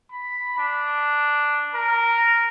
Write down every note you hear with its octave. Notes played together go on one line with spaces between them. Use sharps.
B5
D4
A#4